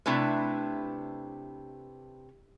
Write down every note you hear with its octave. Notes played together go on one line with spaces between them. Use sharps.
C3 A3 D4 E4 B4